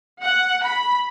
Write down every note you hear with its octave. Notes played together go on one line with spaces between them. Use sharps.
F#5
B5